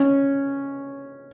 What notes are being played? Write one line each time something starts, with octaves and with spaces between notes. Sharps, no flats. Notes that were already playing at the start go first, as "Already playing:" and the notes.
Already playing: C#4